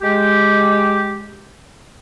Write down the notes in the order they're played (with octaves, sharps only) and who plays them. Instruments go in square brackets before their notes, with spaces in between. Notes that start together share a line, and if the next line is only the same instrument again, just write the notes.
[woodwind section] G#3 G4